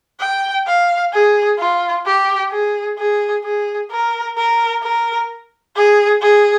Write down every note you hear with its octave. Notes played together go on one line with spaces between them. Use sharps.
G5
F5
G#4
F4
G4
G#4
G#4
G#4
A#4
A#4
A#4
G#4
G#4